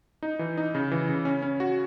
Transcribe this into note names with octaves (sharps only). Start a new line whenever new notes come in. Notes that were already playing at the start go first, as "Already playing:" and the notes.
D#4
E3
D#4
C#3
E3
C#3
C#4
C#4
F#4